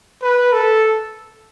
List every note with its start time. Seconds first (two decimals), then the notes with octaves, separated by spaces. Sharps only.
0.22 B4
0.53 A4